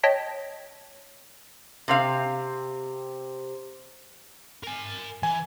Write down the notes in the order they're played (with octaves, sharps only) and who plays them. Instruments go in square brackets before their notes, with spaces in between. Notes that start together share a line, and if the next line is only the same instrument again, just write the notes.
[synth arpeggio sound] C#5 D#5 G5 A5 B6
[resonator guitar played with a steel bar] C3 C4 F5
[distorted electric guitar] A#4 G#5
[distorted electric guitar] E3 [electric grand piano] G#5